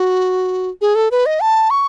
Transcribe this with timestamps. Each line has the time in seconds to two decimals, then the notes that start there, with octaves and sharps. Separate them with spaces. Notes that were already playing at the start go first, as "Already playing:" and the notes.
Already playing: F#4
0.81 G#4
0.95 A4
1.11 B4
1.26 D#5
1.41 A5
1.70 C#6